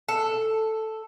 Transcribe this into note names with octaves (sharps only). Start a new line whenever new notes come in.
A4